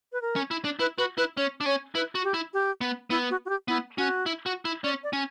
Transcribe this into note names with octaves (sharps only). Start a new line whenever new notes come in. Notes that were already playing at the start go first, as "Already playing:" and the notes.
B4
A#4
C#4
E4
D4
E4 B4
F#4 B4
E4 B4
C#4 C#5
D4
C#4 C#5
E4 B4
F#4
G4
E4
G4
B3
B3 E4
F#4
F#4
G4
B3 E4
C#4 F#4
E4
F#4
E4
C#4 D5
D5
C#4